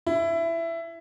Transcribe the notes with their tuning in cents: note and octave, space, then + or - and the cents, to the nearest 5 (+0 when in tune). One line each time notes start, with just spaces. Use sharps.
E4 +15